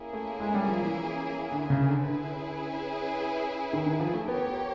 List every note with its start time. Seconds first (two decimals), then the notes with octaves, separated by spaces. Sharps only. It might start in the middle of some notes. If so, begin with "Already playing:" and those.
Already playing: A#3 C#4 E4 G#4
0.13 A3
0.40 G#3
0.54 G3
0.68 F3
0.82 E3
1.52 D3
1.70 C#3
1.88 D3
2.06 D3 C#4 E4 G#4 B4
3.73 D#3
3.86 D#3
4.00 F3
4.14 A3
4.28 B3 G4 A#4 C#5
4.47 B3